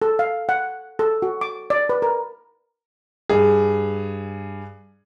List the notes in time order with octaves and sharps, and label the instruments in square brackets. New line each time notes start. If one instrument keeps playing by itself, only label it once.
[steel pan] A4
F5
F#5
A4
F#4
D6
D5
B4
A#4
[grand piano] G2 G#4